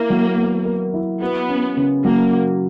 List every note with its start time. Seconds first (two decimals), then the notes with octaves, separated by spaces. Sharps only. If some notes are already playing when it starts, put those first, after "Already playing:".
Already playing: A#3 E4 A#4
0.10 F#3
0.38 B3
0.65 A#4
0.94 E4
1.21 B3 F#4
1.49 C#4
1.77 C#3
2.05 F#3 A#3
2.33 F#4